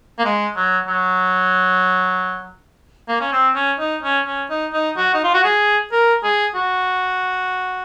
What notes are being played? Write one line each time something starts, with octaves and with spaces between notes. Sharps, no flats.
A#3
G#3
F#3
F#3
A#3
C#4
C4
C#4
D#4
C#4
C#4
D#4
D#4
F#4
D#4
F4
F#4
G#4
A#4
G#4
F#4